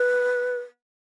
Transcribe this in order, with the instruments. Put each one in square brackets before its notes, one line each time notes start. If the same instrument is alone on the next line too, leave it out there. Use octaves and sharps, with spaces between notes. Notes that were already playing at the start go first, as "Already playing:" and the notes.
Already playing: [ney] B4